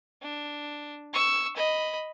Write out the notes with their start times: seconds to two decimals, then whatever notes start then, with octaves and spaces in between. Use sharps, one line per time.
0.22 D4
1.13 C#6 E6
1.56 D#5 B5